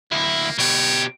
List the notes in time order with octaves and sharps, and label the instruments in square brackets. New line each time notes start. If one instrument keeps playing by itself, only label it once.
[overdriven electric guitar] D2 E4 [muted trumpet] A#3
[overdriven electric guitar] B2 G4 [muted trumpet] C#5